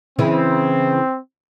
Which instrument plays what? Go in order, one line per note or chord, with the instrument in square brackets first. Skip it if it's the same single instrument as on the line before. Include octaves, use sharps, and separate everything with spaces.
[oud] C#3 E3 E4 [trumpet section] C4